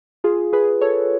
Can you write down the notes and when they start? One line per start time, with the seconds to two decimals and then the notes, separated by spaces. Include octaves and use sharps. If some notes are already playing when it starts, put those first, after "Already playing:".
0.24 F4 G#4
0.53 G#4 B4
0.81 A4 C#5